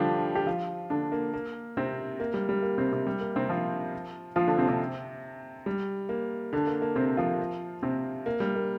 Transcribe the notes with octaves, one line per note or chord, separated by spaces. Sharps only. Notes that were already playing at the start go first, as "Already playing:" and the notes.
Already playing: D3 F3 G3 D4 F4 G4
G4
F3 F4
D3 D4
A#3
A#3
C3 C4
A#3
G3
G3
A#3
C3 C4
C3 C4
G3
A#3
C3 C4
F3 F4
F3 F4
D3 D4
C3 C4
C3 C4
G3
A#3
D3 D4
A#3
A#3
C3 C4
F3 F4
C3 C4
A#3
G3
A#3